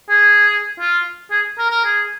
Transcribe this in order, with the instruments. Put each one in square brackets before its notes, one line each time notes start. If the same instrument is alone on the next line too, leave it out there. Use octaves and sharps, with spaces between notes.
[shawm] G#4
F4
G#4
A#4
A#4
G#4